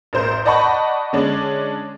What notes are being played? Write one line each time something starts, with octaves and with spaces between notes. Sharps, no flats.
A1 A#4 C5 G6
D5 D#5 F#5 A5 B5 C#6
D3 G#3 C#4 D4